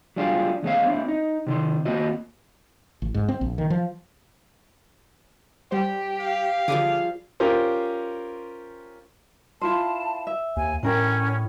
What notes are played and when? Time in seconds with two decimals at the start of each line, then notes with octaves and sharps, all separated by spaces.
0.16 F#3 G3 D4 F4 G4 G#4
0.63 E2 G#3 C#4 F5
0.85 C4 D4 E4
1.08 D#4
1.47 C3 D#3 C6
1.85 D#2 A#3 C4 F#4 D#5
3.02 A1
3.14 G#2
3.28 C4
3.41 A#1
3.58 D#3
3.70 F3
5.71 G3 G4 C5
6.20 F5
6.68 D3 F3 G3 G#4 D6 D#7
7.40 C#4 F4 G4 A#4 C5
9.62 E4 F4 C5 A5
10.27 E5
10.56 D#2 G#5
10.83 A2 C#4 D4 A#4 G5